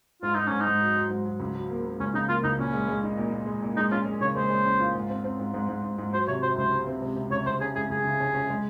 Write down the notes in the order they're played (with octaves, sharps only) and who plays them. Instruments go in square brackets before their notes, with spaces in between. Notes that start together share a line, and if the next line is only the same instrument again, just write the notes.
[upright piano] G#2 [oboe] F4
[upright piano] G#2 [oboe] D#4
[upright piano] G#2 [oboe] C#4
[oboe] D#4
[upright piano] G#2
F#3
F#3
G#2
F#3
C#2
F#3
A#3
A#3
[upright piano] C#2 [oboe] C#4
[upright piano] C#3 [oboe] D#4
[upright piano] A#3 [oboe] F4
[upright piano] C#2 [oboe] D#4
[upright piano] A#2 [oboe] C#4
[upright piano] G#3
G#3
D#4
A#2
A#2
G#3
A#2
[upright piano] G#3 [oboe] D#4
[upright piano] C#4 [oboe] F4
[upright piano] G#3
[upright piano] C#3 [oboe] C#5
[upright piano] G#3 [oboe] C5
[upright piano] G#3
C#4
F4
G#2
C4
C4
G#2
G#2
G#2
G#2
G#2
[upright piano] F#3 [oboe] C5
[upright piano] C3 [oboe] C#5
[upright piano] F#3 [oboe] C5
[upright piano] C#2 [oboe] C5
[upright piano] C4
C4
C3
C3
[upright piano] C#2 [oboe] C#5
[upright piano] C#2 [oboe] C5
[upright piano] C#4 [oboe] G#4
[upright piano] C#2 [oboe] G#4
[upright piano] C#2 [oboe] G#4
[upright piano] C#3
C#4
C#4
G#3